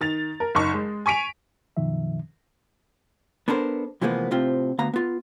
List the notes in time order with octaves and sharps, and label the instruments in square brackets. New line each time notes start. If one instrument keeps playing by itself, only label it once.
[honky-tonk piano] D#3 A6 F7
A#4
F#1 D#4 C#6
G#3
G#5 C#6 B6 D7 F7
[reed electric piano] F#2 B2 D#3 F3 E5
[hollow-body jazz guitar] B3 D4 A4 A#4 C5
C3 E3 F3 G#3 A#3 B3
A2 C3 C4 F4 G4
D2 B3 F5 A#5
B3 F4